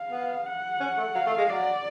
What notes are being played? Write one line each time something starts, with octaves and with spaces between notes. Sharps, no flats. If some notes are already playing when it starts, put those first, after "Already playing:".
Already playing: F5
B3
F#5
C#4
A3
F#3 F5
A3
G#3
F#3 D5